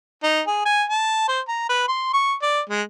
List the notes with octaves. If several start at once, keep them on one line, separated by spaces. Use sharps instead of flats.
D#4
G#4
G#5
A5
C5
A#5
B4
C6
C#6
D5
G#3